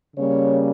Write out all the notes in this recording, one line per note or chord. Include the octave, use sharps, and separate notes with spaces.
C#3 G3 A#3 C#4 C#5